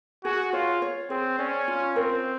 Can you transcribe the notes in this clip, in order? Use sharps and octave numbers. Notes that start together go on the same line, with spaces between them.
F#4 G#4
F4 C#5
C#5
C4 G#4
C#4 D5
F4
C4 A#4